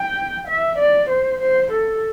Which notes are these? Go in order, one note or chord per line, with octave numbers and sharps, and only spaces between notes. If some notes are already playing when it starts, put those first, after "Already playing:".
Already playing: G5
E5
D5
C5
C5
A4